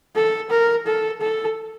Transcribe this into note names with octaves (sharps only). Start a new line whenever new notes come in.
A4
A#4
A4
A4